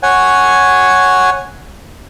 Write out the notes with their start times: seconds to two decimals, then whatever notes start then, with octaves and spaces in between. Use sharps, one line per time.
0.03 C#5 F#5 G#5